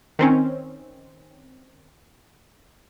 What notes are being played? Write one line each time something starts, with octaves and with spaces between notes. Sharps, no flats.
D#3 C4 C#4